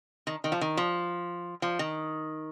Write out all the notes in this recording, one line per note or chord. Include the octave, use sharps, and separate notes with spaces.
D#3
D#3
F3
D#3
F3
F3
D#3